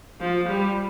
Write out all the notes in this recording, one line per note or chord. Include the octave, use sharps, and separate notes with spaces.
F3
G3